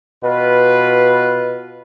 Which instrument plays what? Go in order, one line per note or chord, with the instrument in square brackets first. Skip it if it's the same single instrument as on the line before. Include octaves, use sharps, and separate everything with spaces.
[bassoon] B2 [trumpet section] F4 B4